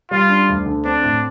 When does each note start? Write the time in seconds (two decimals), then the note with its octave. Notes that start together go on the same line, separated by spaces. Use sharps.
0.11 G3 F4
0.30 D4
0.49 D2
0.66 D3
0.85 C4 D4
1.04 A2